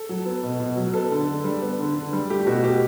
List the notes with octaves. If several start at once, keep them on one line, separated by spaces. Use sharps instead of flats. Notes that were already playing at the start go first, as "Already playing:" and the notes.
Already playing: A4
F#3
B3
B2
B2
F#3
B3 A4
D3
D3
G3
B3
D3
D3
G3
A3 G4
B2 F#4
B2 G4